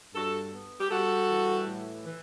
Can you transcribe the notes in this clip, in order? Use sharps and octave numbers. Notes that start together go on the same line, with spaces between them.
G2 F#4 A4
B3
G4
G3 F#4 A4
E3
A2
E3